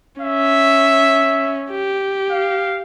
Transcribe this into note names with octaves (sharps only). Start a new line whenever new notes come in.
C#4 E5
G4
F5